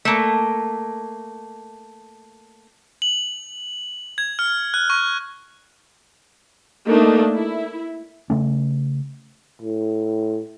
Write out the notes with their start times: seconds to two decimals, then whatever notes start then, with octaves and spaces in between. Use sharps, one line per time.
0.05 A3 A#3
3.02 F#7
4.18 G#6
4.39 F6
4.74 F#6
4.90 C#6
6.88 A3 A#3 D4 D#4
7.34 E4
8.30 C#3 A3 C#4
9.62 A2